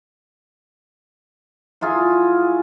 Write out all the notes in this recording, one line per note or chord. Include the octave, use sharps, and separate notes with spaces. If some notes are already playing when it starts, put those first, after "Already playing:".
F#3 E4 F4 G#4